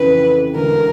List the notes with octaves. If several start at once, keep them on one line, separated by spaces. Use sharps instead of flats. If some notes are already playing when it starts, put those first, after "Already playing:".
Already playing: F2 C#3 E3 B4
E1 D2 D3 A#4